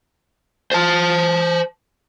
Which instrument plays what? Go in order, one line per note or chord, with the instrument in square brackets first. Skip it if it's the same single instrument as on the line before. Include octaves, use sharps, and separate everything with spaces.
[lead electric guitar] C5 A5